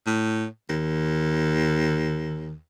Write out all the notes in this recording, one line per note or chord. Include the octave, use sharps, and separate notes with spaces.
A2
D#2